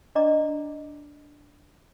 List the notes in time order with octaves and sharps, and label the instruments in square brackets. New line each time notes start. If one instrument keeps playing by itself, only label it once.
[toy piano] D4 D5 D#5 A#5 D6